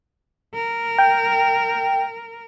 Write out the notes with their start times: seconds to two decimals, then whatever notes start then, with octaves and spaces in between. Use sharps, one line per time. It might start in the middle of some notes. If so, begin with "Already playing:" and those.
0.54 A#4
0.98 G5